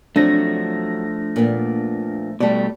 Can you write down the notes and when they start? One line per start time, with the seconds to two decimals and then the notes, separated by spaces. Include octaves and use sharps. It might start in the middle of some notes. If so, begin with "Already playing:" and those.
0.16 F3 F#3 A3 C4 D4 A#6
1.36 A#2 A#3 B3
2.40 B2 G3 A3 D5